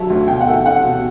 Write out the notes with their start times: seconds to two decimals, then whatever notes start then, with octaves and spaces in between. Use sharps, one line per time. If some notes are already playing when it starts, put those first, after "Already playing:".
Already playing: D3 F#3 C#5 E5 A5
0.10 D2
0.28 B2 G5
0.41 F#5
0.47 A3
0.53 G5
0.66 C#4 F#5
0.85 B2